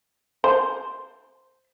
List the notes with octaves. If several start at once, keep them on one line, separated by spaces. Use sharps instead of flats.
C5